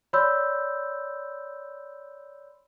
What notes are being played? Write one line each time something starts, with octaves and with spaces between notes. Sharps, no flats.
C#5 D5 B5 C6 E6 G6